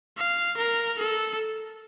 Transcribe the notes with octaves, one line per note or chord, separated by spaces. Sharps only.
F5
A#4
A4